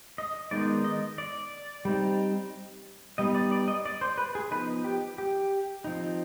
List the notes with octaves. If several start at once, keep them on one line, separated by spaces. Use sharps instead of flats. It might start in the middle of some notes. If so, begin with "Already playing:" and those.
D#5
D#3 G#3 B3 D#4 D5
D#5
D5
G3 C4 D#4
G3 B3 D#4 D#5
D5
D5
D#5
D5
C5
B4
G#4
F3 B3 D#4 B4
G4
G4
F3 C4 D#4